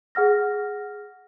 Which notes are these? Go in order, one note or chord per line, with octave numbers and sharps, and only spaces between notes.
G#4 F#5 F6 A#6